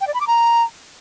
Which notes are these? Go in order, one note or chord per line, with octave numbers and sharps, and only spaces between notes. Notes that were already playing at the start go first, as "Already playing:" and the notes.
G5
D5
B5
D6
A#5